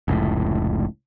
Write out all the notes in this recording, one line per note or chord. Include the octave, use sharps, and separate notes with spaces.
F1 C#2 A2